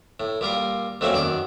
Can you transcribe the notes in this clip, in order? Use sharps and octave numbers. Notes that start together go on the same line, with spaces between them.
A2
A#2 G3 A#4 F5
F2 F#3 A3 A#3 C4 C#4
F#2 D#3 D5